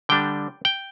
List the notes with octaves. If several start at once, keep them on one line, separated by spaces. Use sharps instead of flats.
D3 G3 D4 G5
G5